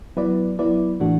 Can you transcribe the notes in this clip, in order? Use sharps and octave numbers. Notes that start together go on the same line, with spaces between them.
F#3 B3 E4 B4 D5
F#3 B3 E4 B4 D5
A2 E3 A3 D4 F#4